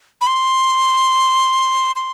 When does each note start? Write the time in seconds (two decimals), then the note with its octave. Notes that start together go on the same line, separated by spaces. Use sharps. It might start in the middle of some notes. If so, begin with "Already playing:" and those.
0.21 B5
0.27 C6
1.96 C6